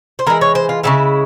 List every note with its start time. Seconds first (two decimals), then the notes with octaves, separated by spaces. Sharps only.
0.19 C5
0.27 E3 G#3 A#4
0.41 C#5
0.55 C5
0.69 F4
0.83 C#3 F3 G#3 E4